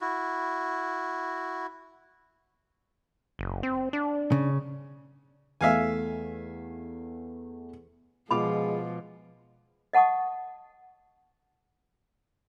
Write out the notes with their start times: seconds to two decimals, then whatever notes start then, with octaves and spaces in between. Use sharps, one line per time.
0.01 E4 F#4
3.39 F#1
3.63 C4
3.93 D4
4.32 C#3
5.61 E2 A3 E5 F5 G#5
8.31 B2 F3 G#3 F4 B5 D6
9.93 D#5 F#5 A5 C#6 D#6